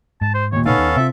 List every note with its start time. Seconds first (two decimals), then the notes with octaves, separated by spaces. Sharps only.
0.21 G#2 A5
0.34 C5
0.52 D#2 A#2 C#5
0.66 A#2 C#3 A#3 B3 C#4 D#4 A4 F5
0.78 D#2
0.96 C3 C4 F4 E5